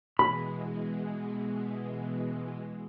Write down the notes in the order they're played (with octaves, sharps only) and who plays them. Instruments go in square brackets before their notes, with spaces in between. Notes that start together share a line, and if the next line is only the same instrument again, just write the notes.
[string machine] B2 E3 G#3 [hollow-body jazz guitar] B5